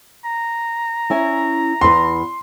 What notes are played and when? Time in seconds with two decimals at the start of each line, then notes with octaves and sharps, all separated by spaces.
0.25 A#5
1.10 C#4 E4 G#5
1.81 E2 B4 C6